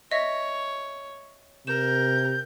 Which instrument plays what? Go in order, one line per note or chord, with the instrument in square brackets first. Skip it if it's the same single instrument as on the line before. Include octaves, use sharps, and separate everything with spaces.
[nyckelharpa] C#5 [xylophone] D#5 E5 A#6
[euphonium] C3 [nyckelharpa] A#4 [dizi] G6 [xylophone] E7